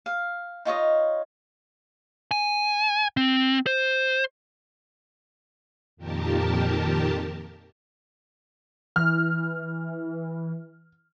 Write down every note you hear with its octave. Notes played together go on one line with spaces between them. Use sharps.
F5
D#4 F4 C#5 D#5
G#5
C4
C5
F2 A#2 D#3 G4 A#4 A5
E3 F6